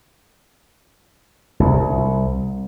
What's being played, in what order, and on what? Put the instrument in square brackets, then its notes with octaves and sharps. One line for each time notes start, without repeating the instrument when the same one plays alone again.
[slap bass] C2